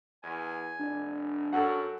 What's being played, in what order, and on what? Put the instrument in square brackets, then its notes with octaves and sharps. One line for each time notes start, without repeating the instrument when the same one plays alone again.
[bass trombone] E2 [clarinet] G#5
[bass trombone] F1 [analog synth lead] D4
[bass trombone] F#2 [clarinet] F#4 [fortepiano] A4 F#5